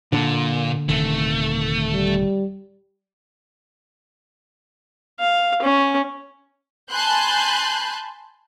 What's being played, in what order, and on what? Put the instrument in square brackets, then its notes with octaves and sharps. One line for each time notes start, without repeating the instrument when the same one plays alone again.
[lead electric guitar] A#2 [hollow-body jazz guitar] D3
[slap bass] D#1 C3 D#3 [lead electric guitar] A3
[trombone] G3
[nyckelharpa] F5
C#4
[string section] G#5 A5 B5 C6 F#6 G6